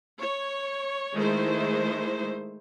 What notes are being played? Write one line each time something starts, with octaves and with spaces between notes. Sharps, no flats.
C#5
D#3 G#3 A3 E4 C5